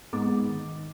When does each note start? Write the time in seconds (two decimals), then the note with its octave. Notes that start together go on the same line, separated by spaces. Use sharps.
0.13 G#2 B3 D#4 D6 A6
0.48 D#3